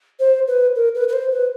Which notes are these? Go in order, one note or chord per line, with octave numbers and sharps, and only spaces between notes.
C5
B4
A#4
B4
B4
C5
B4